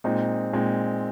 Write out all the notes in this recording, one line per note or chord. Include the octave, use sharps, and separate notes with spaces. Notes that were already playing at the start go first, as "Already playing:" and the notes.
A#2 G#3 C4 D#4
A#2 G#3 C4 D#4